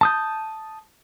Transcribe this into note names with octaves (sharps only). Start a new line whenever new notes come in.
A5 D#6 G6